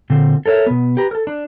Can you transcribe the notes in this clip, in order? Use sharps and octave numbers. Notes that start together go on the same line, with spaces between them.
A#2 D3 C4
A4 A#4 C#5 D#5 E5
B2 B3
G4 B4 A#5
A4 A#4
D4